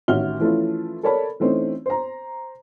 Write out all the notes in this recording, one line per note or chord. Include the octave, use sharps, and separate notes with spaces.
A1 D#3 F#4 E5 F6 G7
E3 F3 A3 C#4 E4 F4
A4 A#4 C#5 D5 A5 B5
E3 A3 C4 C#4 D#4
C5 A#5